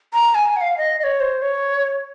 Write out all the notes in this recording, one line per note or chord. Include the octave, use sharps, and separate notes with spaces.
A#5
G#5
F#5
F5
D#5
D#5
C#5
C5
C#5